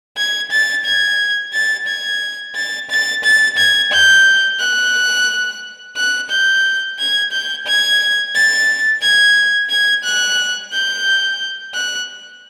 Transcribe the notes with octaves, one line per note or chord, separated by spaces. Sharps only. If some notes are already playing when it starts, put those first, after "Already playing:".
G#6
A6
G#6
A6
G#6
A6
A6
A6
G#6
G6
F#6
F#6
G6
G#6
G6
G#6
A6
G#6
G#6
F#6
G6
F#6